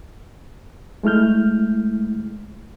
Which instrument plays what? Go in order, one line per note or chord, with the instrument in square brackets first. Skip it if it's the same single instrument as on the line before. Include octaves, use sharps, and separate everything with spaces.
[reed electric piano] G#3 A3 E4 F6 G6